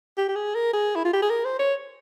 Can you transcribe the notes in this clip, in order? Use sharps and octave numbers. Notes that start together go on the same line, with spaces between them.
G4
G4
G#4
A#4
G#4
E4
F4
G4
G#4
A#4
C5
C#5